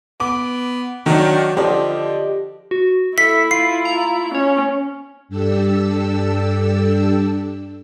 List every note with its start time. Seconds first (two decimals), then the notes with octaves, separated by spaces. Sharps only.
0.20 B3 D6
1.06 D#3 F#3 D4
1.57 D3 F3 G4 D5 D#5
2.71 F#4
3.18 E4 A4 E5 B6
3.51 F4 C7
3.85 A#5
4.35 C#4 C#5
5.29 G2 D4 G4 A4 E6